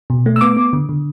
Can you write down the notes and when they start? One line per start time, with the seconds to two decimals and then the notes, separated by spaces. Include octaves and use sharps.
0.10 B2
0.26 A3
0.36 E6
0.41 B3 D6
0.57 B3
0.73 D3
0.89 D3